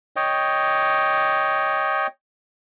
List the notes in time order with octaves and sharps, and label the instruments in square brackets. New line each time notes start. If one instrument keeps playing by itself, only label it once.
[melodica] C#5 D#5 G5